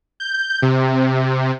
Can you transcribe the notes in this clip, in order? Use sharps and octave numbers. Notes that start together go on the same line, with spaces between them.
G6
C3